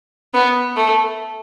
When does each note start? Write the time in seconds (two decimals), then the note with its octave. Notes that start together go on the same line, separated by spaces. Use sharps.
0.34 B3
0.76 A3